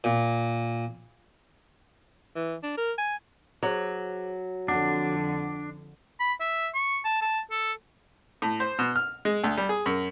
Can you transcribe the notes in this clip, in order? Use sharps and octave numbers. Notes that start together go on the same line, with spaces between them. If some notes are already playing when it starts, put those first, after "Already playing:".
A#2
E3
D4
A#4
G#5
F#3 G#4 C5 D6
F2 D3 D4 F#5 D6
B5
E5
C#6
A5
A5
A4
A2
C5
B2
F6
G#3
D2
G3
G#4
F#2